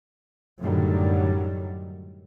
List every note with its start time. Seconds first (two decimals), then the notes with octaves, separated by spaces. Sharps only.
0.60 F#2 A2 D3 D#3 F#3 G3